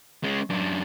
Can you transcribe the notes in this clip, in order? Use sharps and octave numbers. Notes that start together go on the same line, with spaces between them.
G#3 C#4
F#2 D4